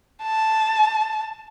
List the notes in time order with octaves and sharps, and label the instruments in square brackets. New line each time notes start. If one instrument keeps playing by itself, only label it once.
[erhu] A5